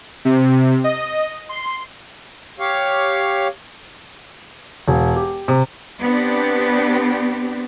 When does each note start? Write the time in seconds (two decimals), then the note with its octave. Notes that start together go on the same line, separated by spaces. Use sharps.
0.25 C3
0.84 D#5
1.49 C6
2.59 G4 C#5 F5
4.88 E1
5.16 G4
5.48 C3
6.01 B3 C4 D4 G4